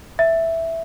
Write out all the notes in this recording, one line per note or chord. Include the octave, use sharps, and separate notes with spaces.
E5